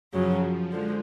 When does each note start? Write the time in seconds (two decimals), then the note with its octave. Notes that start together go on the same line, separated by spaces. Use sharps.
0.13 F#2 C#3 F3 F#3
0.71 D3 F3 G#3